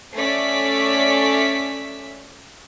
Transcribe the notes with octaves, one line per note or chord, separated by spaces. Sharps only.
A3 C#4 C#5 D5 E5 B6